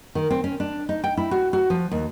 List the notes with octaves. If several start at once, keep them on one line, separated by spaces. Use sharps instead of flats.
D#3
C4
C#4
D4
D#4
G5
E4
F#4
F#4
F3
D#2